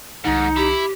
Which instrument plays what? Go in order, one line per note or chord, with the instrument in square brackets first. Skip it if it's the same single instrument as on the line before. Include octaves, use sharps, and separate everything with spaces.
[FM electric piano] C2 D#3 C#7 [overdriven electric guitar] G#2 [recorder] D#4
[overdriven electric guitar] E4 [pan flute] G4